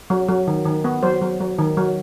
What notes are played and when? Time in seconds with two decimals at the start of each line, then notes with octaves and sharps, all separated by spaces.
0.10 F#3
0.29 F#3
0.47 D#3
0.66 D#3
0.84 B3
1.03 F#3 C5
1.22 F#3
1.40 F#3
1.59 D#3
1.77 F#3